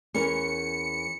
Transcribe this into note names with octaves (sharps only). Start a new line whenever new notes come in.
E2 C#4 A#4 C#7